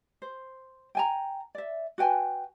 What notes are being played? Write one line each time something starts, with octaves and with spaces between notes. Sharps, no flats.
C5
G5 G#5 A#5
D5 E5
F#4 B4 G5 G#5